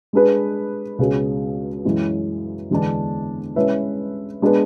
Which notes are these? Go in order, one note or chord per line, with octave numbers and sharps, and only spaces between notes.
G#3 D4 G#4 B4
C#2 B2 G#3 C#4 G#4
F#2 E3 G#3 C#4
E2 D3 G#3 B3 D4
G#3 C#4 E4 B4 E5
G#3 B3 D4 G#4 B4